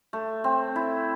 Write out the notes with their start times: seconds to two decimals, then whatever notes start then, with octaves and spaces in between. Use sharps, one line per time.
0.13 A3
0.44 C4
0.76 E4